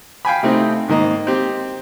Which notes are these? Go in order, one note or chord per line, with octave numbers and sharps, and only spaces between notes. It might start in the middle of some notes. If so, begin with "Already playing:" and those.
F5 G5 G#5 B5
C3 A3 C4 D#4
G#2 D#3 A#3 D#5
C4 G4